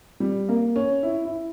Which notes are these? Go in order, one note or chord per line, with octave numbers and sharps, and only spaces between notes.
G3
A#3
C#4
E4
E4